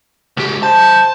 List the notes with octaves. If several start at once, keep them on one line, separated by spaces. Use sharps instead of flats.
C#2 G4
C5 A5